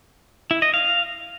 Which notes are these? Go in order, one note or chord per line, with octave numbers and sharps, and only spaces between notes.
E4
D#5
F5